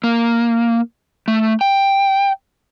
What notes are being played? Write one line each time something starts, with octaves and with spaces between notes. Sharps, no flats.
A#3
A3
G5